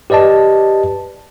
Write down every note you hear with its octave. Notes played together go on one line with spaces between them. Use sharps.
G4 B4 D5 D#5 A5